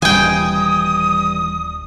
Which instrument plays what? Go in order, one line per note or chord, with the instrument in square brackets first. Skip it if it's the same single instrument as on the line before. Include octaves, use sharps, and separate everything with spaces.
[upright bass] D#1 [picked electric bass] E3 G3 [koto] G5 G#5 [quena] D#6